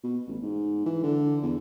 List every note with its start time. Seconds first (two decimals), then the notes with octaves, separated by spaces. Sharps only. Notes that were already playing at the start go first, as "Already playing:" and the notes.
0.04 B2
0.27 A1
0.43 G#2
0.86 E3
1.03 D3
1.42 E2